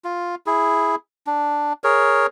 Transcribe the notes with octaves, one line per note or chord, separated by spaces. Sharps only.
F4
E4 G#4
D4
G#4 A#4 C#5